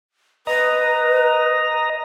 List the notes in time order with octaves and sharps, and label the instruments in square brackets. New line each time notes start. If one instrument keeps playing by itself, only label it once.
[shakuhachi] B4 [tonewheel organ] D#5 A#5